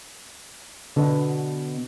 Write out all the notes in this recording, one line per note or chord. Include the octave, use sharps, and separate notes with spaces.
B2 D3